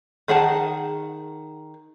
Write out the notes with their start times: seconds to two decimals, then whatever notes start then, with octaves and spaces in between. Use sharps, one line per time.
0.28 D#3 G#4 F#5 A5